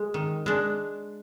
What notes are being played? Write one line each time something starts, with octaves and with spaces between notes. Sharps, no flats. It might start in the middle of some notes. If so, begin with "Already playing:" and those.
Already playing: G#3
D#3
G#3 D4